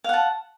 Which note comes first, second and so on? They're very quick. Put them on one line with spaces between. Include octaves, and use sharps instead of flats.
F5 F#5 A5